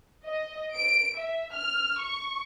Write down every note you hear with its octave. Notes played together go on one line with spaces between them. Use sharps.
D#5
D7
E5
F6
C#6